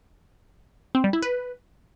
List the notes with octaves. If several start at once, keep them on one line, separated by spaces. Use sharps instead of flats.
C4
G3
E4
B4